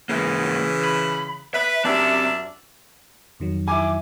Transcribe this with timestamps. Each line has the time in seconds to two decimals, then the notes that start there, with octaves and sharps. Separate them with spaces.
0.09 G#2 C#3 E3 A#3
0.84 B5
1.54 B4 E5
1.85 F#2 C4 D4 G4 E5
3.40 F2 D#3 F#3
3.68 E4 G#5 D6